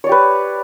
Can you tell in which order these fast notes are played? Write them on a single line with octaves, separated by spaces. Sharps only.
C#5 D5 G4 B4